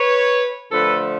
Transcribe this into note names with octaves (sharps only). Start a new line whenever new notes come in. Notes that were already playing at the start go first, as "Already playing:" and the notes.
Already playing: B4 C#5
D3 F3 A3 A4 B4